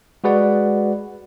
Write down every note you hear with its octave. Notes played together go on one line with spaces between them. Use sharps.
G#3 F#4 G#4 B4 D5 F#5